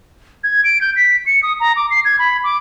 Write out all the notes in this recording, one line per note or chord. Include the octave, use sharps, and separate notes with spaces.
G#6
D7
G6
B6
C#7
D#6
A#5
D6
C7
G#6
B5
D6